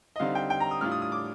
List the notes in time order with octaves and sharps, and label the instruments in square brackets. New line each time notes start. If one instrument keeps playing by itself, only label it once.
[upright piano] D#5
D3 G3 C4 D#4 F5
G5
G5
A#5
D#6
A2 G3 D4 F4 F6
D#6
D#6
D6